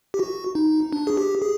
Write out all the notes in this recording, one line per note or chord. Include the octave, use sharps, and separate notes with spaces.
G4
F#4
D#4
D4
G#4
G4
G#4